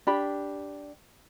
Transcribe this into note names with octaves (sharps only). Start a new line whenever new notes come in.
D4 G4 B5